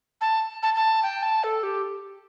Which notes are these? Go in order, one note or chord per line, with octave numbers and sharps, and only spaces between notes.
A5
A5
A5
G5
A5
A4
G4